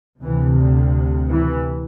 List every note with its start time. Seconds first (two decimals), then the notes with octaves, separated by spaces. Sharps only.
0.20 D2 C3 E3
0.56 D3
1.27 E3